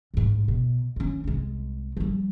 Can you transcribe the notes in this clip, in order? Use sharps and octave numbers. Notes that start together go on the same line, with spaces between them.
A#1 G#2
B2
D#3 C#4
C2 G#3
F3 G3